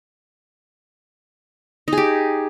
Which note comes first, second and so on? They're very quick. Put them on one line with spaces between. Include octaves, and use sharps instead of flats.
D#4 G#4 G4